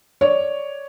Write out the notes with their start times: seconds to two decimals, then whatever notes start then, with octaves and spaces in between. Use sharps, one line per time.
0.21 C#5 D5